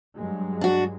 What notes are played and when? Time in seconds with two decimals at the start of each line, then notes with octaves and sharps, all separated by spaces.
0.18 G2 F#3 G#3
0.61 D4 F#4